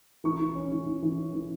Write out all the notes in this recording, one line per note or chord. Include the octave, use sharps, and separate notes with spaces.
E3 C#6
E3
C#4
E3
E3
E3
C#4
E3